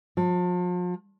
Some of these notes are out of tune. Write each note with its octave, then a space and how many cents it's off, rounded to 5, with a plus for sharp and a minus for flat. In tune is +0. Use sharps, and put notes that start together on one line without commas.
F3 +40